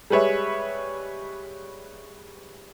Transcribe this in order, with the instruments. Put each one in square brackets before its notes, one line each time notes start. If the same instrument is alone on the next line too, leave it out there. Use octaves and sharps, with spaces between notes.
[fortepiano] G3 G#3 B4 C#5 E5